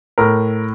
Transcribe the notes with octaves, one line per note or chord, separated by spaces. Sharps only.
A2 A#4